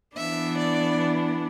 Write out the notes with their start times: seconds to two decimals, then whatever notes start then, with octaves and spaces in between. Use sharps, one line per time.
0.15 E3 B3 D4 E5
0.55 D5